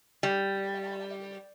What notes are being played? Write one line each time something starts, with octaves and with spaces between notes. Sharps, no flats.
G3